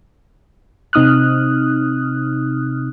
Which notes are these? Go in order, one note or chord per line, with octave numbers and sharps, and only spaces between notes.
C3 C4 D#4 D#6 F6 F#6